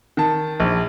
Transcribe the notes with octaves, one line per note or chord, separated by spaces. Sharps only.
D#3 A5
A#1